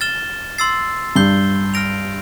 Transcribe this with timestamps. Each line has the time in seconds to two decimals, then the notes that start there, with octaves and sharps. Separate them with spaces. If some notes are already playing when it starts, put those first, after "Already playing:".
0.01 F6 A6 E7 G7
0.58 C6 E6 A6 C7
1.16 G2 G6 C7 G7
1.74 F6 A#6 D7 F7